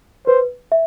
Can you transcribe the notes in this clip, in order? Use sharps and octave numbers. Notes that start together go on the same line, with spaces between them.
B4 C5
E5